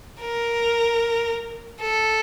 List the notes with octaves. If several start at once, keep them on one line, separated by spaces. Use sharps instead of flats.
A#4
A4